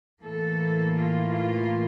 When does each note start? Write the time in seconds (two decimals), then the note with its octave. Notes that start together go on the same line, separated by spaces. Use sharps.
0.22 A2 E3 A#3 A4
0.94 F4
1.31 F4